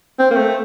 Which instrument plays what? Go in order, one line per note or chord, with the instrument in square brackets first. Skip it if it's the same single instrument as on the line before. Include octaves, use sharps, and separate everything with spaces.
[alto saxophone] C4
A#3
A3